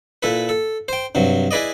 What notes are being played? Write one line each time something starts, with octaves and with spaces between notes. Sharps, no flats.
A#2 E4 A4 B4
A4
C5 G5
G2 C3 F#3
E4 G#4 B4 D5 D#5